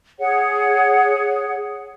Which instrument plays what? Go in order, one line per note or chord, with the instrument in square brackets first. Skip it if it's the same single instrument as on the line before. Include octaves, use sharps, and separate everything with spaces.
[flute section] G#4 C#5 F#5